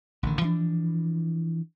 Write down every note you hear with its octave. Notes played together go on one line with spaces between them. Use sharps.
A1 D3 D#3
E3 F3 D4